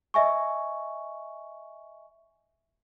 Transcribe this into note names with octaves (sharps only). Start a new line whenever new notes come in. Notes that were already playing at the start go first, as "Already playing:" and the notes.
D#5 E5 G#5 C#6